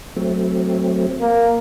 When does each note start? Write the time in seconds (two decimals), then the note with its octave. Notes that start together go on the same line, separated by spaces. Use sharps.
0.16 F#3 A3 C4
1.21 A#3